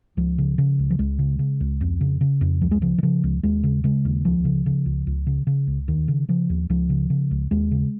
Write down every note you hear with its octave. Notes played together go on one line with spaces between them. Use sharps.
C#2 F3
C#3
C#3
C#2
F3
C#2 G#3
C#3
C#3
C#2
F2
C#3
C#3
F2
C#2 F3
G#3
C#3 F3
D#3
C#3 F3
C#2
D#2 G#3
C#3
C#3 G#3
D#2
C#2 F3
C#3
C#3
C#2
C#2
C#3
C#3
C#2
D#2 D#3
C#3
C#3 F3
D#2
C#2 F3
C#3
C#3
C#2
D#2 G#3
C#3